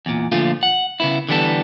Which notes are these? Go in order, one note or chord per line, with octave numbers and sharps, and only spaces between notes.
E2 A#2
A#2 D3 F3 A3 F4
F#5
C#3 B3 E4
D3 E3 G3 B3 A4